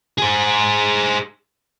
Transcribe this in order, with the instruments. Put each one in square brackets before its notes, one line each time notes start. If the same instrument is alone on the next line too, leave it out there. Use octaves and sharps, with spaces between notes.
[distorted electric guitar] G#4 C5